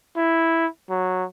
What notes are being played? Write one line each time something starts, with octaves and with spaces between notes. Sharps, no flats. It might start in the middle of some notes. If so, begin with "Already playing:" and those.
E4
F#3